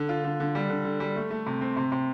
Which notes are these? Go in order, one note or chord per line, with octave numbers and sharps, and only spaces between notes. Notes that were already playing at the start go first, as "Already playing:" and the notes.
Already playing: D3
F4
D3
D3
G3
D3
D3
G3
A3
A3
C3
C4
C3
C3